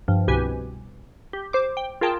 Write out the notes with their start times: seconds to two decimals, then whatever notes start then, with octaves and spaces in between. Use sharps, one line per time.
0.08 G2 F3
0.28 C2 B2 G4 B4 G#5
1.33 G4
1.53 C5 D6
1.77 G5
2.01 F4 G#4 A#4 G5 A5